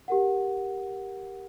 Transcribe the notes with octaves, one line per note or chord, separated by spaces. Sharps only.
G4 A#4 F#5